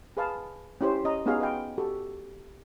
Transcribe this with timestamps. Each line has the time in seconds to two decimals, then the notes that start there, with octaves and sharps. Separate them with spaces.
0.17 G#4 B4 F5 A5
0.81 C#4 E4 G4 C5
1.04 C#4 D#5 A#5
1.26 B3 C#4 D#4 F#4 G#4 F5
1.40 B4 D#5 F5 G5
1.78 F#4 G4 A4